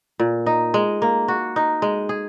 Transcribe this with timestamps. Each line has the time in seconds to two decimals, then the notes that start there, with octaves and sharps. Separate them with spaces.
0.20 A#2
0.46 D#4
0.74 G#3
1.02 A#3
1.28 F#4
1.56 D#4
1.82 G#3
2.09 G#4